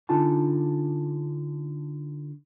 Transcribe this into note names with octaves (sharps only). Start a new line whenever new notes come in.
D3 D4 D#4 F4 G#5 A5